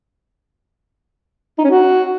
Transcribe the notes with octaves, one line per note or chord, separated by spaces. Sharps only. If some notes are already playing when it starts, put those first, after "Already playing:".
D#4
C#4
F#4